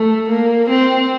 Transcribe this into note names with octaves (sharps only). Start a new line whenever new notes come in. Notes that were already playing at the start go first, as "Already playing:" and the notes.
Already playing: A3
A#3
C4